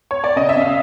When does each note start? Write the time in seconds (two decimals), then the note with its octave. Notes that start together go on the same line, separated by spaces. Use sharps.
0.11 C#5
0.24 D5
0.36 C#3 D#5
0.49 E5
0.56 C#3
0.62 F5